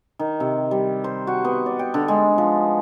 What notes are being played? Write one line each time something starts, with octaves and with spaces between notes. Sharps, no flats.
D#3
C3
G3
C5
F#4
B3
D5
G5
D3
G#3
F3